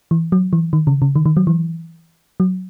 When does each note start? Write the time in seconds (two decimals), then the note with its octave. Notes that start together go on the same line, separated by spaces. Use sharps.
0.11 E3
0.32 F#3
0.53 E3
0.73 D#3
0.87 C#3
1.02 C#3
1.16 D#3
1.26 D#3
1.37 F#3
1.47 E3
2.40 F#3